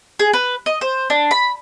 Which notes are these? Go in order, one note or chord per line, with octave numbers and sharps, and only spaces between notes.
G#4
B4
D#5
C5
D4
B5